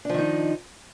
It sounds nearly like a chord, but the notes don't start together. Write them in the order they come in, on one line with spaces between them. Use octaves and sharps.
D4 F3 D#3 D#4